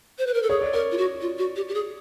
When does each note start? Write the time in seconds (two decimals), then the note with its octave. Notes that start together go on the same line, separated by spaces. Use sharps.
0.18 C5
0.27 B4
0.34 A#4
0.42 A4
0.49 G#4 C#5
0.61 D5
0.73 A#4 C#5
0.92 F4
0.98 F#4
1.21 F4
1.38 F#4
1.56 G4
1.69 G4
1.74 G#4